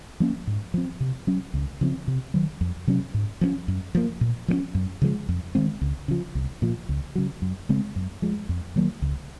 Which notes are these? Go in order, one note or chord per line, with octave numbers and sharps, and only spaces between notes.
F3 A#3 C#4
G#2
F3 C4
C3
F#3 C#4
C#2
C#3 F3 C4
C3
D#3 F#3
F2
C3 F#3 C#4
G#2
F3 A#3 C#4
F#2
F3 A#3
A#2
F3 A#3 C#4
F#2
C#3 F3 G#3
F2
D#3 G#3 C4
C#2
C#3 F3
C2
A#2 F3
C#2
C#3 F#3
F#2
C#3 G#3 C4
F#2
F3 G#3
F2
D#3 F#3 A#3
C#2